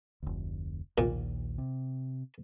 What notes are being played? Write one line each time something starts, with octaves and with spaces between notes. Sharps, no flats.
F1 D2
A#1 D#2 A#2
C3